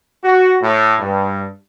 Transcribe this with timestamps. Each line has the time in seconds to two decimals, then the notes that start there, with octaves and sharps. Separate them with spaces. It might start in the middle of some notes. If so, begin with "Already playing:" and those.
0.23 F#4
0.62 A2
1.00 G2